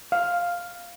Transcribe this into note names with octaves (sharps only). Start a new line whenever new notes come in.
F5